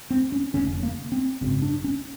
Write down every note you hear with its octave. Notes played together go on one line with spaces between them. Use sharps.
C4
C#4
D#2 D3 C#4
F1
A#3
C4
G#1 F#2 C#3 C4
D4
C#4